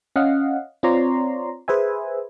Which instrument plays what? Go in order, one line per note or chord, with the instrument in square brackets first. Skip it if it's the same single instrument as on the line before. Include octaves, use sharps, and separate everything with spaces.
[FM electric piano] C#4 D#5 F5 F#5
C4 F4 C#5 D5 A#5 C6
G#4 B4 C5 E5 G#5